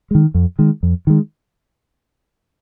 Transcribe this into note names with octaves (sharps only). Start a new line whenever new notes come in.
D#3 G#3
F2
D#3 G#3
F2
D#3 G#3